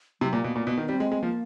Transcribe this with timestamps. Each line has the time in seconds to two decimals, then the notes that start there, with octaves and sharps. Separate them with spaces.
0.21 C3 F#3
0.33 A#2
0.39 A#3
0.44 B2
0.56 A#2 B3
0.67 B2
0.71 B3
0.77 D#3
0.81 B3
0.88 G3 C4
1.00 G#3
1.12 G#3
1.22 F3 A#3